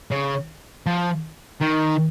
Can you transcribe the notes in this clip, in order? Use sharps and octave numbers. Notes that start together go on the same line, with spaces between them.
C#3
F3
D#3